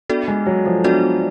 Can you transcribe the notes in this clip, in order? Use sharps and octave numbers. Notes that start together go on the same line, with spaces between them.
B3 D4 F#4 A4 D5
G#3
F#3
F3
B3 D4 F#4 A4 D5